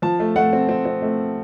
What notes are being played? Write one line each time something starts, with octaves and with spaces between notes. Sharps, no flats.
F3 A5
A3
A3 F#5
C4
C4
C4
A3